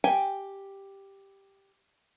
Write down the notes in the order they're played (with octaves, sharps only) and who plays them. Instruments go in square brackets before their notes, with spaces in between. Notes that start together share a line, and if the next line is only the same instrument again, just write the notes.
[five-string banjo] G4 G5 G#5